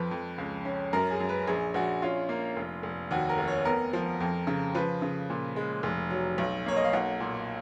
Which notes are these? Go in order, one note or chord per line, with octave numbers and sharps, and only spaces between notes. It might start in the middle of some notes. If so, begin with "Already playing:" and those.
Already playing: F2 F3 B4
F2
C#2
C#4
F#2 A#4
G#4
F#2
B4
A#1 G#4
A#1 F#4
C#4 F4
A#3
F1
F1
D#2 F#4
A#4
F1
C#5
B3 A#4
F3
F2
C#3
F3 B4
C#3
A#2
G#3
F1
F#3
B1
A#3 C#5
D#5
F5
B1 F#5
A#2